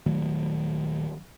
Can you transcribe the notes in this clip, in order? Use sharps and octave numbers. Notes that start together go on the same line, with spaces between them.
D#1 D#3 F#3 A3